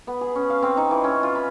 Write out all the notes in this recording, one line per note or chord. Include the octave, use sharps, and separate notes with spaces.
B3
G#4
C#4
F5
C4
D#4
E3
C#4
F4
B5